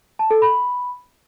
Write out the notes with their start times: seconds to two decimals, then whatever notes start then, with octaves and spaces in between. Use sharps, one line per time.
0.19 A5
0.31 A4
0.42 B5